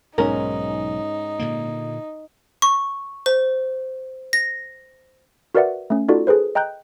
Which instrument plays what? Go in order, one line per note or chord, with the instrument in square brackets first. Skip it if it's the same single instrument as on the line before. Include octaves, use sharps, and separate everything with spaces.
[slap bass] B1 [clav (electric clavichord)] G#2 C#4 [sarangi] D#4 [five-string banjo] A#4
[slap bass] A#2 D3 A#3
[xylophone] C#6
C5
A#6
[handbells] F#4 A#4 B4 D5 E5 F#5
A3 C#4
D#4 F4 F#4 A4 D5
G#4 A4 B4 C5
D#5 G5 A#5 F#6 G6